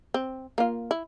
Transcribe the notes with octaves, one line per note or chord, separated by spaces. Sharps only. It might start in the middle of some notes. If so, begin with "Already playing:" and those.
C4
A#3 F4
E4